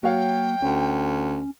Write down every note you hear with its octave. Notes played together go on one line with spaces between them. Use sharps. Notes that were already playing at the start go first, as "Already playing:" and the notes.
F#3 A#3 F#4 C#5 F5 G5
D2 C#4